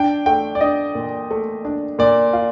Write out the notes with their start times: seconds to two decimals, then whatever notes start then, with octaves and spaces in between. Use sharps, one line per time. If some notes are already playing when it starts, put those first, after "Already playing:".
Already playing: D4 G5
0.26 A3 G5
0.55 D5
0.61 D4 D#5
0.95 A#2
1.31 A3
1.65 D4
1.99 A#2 D5
2.33 F4